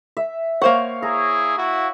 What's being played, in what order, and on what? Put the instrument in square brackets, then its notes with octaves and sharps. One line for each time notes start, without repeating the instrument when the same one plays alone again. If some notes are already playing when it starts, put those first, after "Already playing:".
[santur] E5
[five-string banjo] A#3 C5 F#5 [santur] C#5 F5
[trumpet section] E4 G#4 [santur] A#5
[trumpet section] E4 F#4